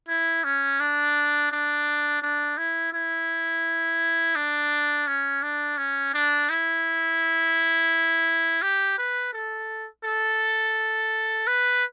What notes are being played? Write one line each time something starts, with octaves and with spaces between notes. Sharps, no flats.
E4
C#4
D4
D4
D4
E4
E4
D4
C#4
D4
C#4
D4
E4
G4
B4
A4
A4
B4